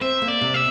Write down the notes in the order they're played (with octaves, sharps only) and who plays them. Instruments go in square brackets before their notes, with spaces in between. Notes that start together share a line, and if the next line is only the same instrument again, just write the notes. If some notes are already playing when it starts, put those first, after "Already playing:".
[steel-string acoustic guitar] C4 [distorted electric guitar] E5
[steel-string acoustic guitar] A#3
[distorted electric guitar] D5
[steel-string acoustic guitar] C3
[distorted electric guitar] E5